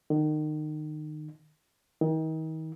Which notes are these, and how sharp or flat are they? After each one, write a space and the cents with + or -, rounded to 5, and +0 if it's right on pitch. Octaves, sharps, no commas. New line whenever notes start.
D#3 -30
D#3 +35